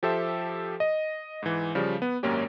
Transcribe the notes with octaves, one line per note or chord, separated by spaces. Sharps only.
F3 G4 A4 C5 E5
D#5
G#2 E3
C#3 F3 G3
B3
G#1 F#2 A#3 C#4 G4